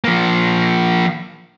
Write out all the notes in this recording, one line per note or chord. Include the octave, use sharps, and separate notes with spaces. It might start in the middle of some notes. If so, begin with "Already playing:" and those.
F3 A#3